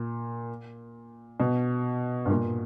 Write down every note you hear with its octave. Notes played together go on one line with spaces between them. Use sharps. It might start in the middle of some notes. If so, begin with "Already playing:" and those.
Already playing: A#2
B2
G2
A#2